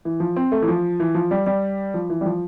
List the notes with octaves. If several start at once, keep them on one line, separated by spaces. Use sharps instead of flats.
E3
F3
C4
A3
E3
F3
E3
F3
G3
G3
F3
E3
G3
F3